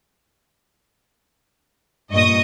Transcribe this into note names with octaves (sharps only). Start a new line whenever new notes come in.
G2 A#2 D#5 C#6 D#6